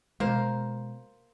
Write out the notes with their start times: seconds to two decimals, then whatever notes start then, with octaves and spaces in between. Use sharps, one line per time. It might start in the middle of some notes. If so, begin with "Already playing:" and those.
0.20 B2 G#3 A#3 A#4 C5